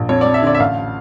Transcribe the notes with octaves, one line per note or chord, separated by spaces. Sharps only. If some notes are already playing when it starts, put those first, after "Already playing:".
Already playing: A#1
F2 C#5
F2 D5
E5
D3 D5
E5
A1 F5